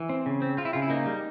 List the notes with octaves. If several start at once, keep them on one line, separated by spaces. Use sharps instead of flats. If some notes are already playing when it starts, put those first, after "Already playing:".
Already playing: E3
C4
C#3
C4
C4 F4
E4
C#3 F4
E4
A#3 D#4
G3